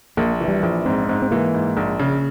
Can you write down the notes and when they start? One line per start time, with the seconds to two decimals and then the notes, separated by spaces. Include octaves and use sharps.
0.17 A#1 A#3
0.41 E3
0.48 G3
0.63 A#1 F3
0.85 G#2 C4
1.09 G#2 C4
1.22 C4
1.31 E3 A#3
1.54 G#2
1.77 A#1
1.99 C#3